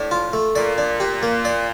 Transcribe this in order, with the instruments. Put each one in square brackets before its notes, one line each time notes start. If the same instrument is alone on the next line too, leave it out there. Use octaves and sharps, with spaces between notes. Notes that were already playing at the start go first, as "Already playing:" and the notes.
Already playing: [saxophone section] A2 [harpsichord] D4
[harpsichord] F4
A3
[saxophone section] A#2 [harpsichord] D5
[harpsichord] D4
G4
A#3
D5